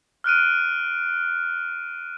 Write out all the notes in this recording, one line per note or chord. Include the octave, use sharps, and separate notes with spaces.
F6 F#6 D7 D#7